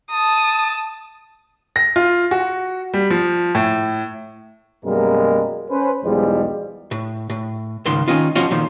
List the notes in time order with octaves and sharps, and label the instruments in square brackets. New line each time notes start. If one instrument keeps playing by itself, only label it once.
[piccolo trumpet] A5 [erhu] D#6
[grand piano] A#6
F4
F#4
G3
F3
A2
[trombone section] F#2 B2 G3 G#3 A#3 A#4
C#4 B4 C5
B1 E2 F3 G3 G#3
[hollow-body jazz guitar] A2
A2
C#2 G#2 D#3 F3 C6
D#3 C#4 D#4 F4
F3 C#4 F4 F#4 D#5
A#2 D#3 F3